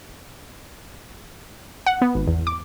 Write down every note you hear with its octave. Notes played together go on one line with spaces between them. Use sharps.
F#5
B3
G#1
E2
D6